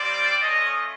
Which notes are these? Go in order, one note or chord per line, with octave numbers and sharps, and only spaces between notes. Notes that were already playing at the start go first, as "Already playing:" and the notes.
Already playing: G3 C4 F4 C5 D5
A3 C#4 F4 C#5 D#5